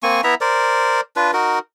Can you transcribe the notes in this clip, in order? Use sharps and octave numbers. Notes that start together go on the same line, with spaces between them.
A#3 C4 G#5 C#6
B3 E4 E5 A#5
A#4 C5 D5
D4 F4 B4
D#4 F#4 A#4